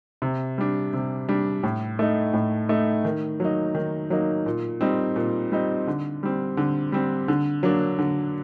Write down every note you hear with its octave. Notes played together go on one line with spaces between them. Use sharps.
C3
G3 D4
C3
G3 D4
A2
A3 D#4
A2
A3 D#4
D#3
F#3 A#3 D#4
D#3
F#3 A#3 D#4
A#2
G3 C4 D#4
A#2
G3 C4 D#4
D3
G3 C4
D3
G3 C4
D3
F#3 A#3 D4
D3